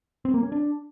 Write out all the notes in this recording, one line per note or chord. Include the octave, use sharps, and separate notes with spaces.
C4
A#3
C#4
D4